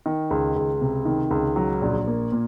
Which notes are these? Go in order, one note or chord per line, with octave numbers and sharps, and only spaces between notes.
D#3
C#2
C#2
C3
D#3
C#2
F#3
A#1
A#3
A#2